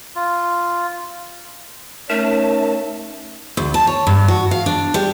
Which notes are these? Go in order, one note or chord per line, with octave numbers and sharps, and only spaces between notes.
F4
A3 C#4 D#4 A#4 C#5 E5 A5
D2
A5
C#5
G2
F#4
F5
D4
G3